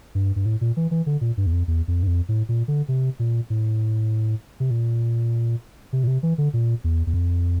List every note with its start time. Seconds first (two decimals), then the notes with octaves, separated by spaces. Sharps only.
0.15 G2
0.36 G2
0.46 A2
0.61 A#2
0.77 E3
0.91 E3
1.06 D3
1.21 A#2
1.37 G2
1.46 E2
1.53 F2
1.68 E2
1.88 F2
2.03 G2
2.07 F2
2.29 A2
2.49 A#2
2.68 D3
2.88 C3
3.19 A#2
3.50 A2
4.60 C3
4.71 A#2
5.93 C3
6.04 A#2
6.07 C3
6.23 E3
6.38 D3
6.54 A#2
6.84 E2
7.07 E2
7.14 F2